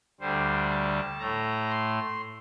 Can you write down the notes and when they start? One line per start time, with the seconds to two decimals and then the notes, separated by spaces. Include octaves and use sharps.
0.20 D2 D3 G3 C5
0.70 A5
1.20 A2 A3 A#5
1.70 C6